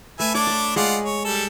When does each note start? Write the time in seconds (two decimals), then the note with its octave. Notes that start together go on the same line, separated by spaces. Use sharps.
0.20 A3 B4 E5 G#5
0.35 D4 C#5 D5 D6
0.47 A5 B5
0.76 G#3 F4 D5 F#5
1.06 C#5
1.24 G3 A4